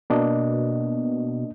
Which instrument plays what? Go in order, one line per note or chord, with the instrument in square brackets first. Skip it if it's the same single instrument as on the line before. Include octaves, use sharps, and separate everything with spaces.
[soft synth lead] B2 [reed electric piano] A#3 D4 D#5